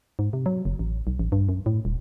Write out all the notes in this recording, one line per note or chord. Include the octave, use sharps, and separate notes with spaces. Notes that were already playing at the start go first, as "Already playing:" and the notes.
G#2
C3
F#3
F#1
A1
B1
A1
G2
F#2
A2
D#1